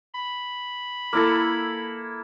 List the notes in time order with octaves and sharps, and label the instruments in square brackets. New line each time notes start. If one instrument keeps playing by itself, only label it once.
[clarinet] B5
[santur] A#3 E4 A4